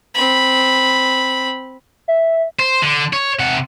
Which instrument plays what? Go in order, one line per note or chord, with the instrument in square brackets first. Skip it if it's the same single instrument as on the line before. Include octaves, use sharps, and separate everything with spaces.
[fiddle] C4 B5
[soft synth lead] E5
[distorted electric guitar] C5
D3
C#5
C3 F#5